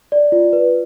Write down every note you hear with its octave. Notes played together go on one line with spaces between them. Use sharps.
D5
F4
B4